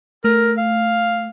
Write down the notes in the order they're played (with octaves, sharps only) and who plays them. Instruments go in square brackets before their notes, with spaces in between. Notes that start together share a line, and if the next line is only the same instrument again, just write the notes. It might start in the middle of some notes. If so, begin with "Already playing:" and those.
[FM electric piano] A3 [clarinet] A#4
[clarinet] F5